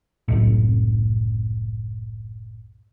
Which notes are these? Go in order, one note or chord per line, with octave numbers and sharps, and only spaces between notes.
F#1 C2 A2